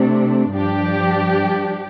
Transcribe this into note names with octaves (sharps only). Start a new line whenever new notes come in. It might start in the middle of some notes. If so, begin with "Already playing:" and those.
Already playing: C3 A3 D4
G2 F3 D4 G4